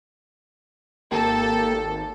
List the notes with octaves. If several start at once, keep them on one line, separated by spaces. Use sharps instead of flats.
G#1 A#3 G4 A4